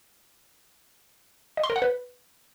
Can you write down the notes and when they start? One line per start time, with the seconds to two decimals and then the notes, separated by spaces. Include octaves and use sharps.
1.57 D#5
1.64 C6
1.70 A#4
1.76 F#5
1.82 B4